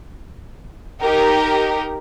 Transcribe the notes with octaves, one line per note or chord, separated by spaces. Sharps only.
D#4 G4 A#4